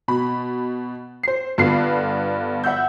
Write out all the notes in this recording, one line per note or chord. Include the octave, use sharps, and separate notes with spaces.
B2 B5
C5 C7
G2 D3 B3 F4 B4 C7
E5 F#5 E6 G6